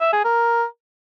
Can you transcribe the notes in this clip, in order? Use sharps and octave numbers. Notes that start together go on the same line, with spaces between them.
E5
G#4
A#4